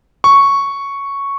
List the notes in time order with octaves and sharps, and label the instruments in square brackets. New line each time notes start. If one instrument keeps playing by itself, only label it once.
[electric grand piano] C#6